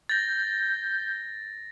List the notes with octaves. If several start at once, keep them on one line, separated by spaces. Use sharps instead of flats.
G6 A6 A#6